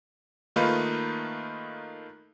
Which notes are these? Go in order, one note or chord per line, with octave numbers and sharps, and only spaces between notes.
D#3 A3 A#3 D#4 F4 B4